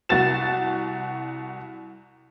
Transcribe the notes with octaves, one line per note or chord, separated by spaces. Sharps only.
C2 F#4 A6 E7